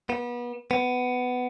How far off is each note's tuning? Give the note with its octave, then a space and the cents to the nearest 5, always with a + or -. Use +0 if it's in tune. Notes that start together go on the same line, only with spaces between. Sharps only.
B3 -30
B3 +15